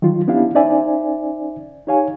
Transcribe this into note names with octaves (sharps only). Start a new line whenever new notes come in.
D#3 F3 F#3 F4
B3 C#4 D4 E4 G4 F5
C#4 D#4 C5 D5 E5 G#5
D#4 G4 C#5 F5 G#5